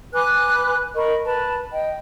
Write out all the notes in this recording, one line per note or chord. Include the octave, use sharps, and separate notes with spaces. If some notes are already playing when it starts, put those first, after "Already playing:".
B4 G#5 D6 F#6
A#4 D#5 B5 C#6
B4 A5 B5
D#5 G5